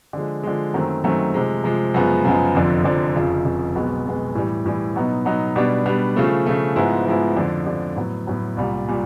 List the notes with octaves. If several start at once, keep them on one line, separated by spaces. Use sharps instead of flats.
D3 F3 G#3
D3 F3 G#3
F#2 D#3 F#3 A3 C4
F#2 D#3 F#3 A3 C4
C3 F3 G#3
C3 F3 G#3
F#2 C#3 F3 G#3 B3
F#2 C#3 F3 G#3 B3
F1 F2 D3 F3
F1 F2 D3 F3
F1 F2 C#3 F3
F1 F2 C#3 F3
B1 B2 G#3 B3
B1 B2 G#3 B3
A2 E3 G3
A2 E3 G3
B2 F#3 B3 D#4
B2 F#3 B3 D#4
B2 G3 B3 D4
B2 G3 B3 D4
C#3 F3 A3
C#3 F3 A3
G#2 F3 G#3 B3 E4
G#2 F3 G#3 B3 E4
F2 D3 F3
F2 D3 F3
A2 F#3 B3
A2 F#3 B3
C2 A#2 G3
A#2 G3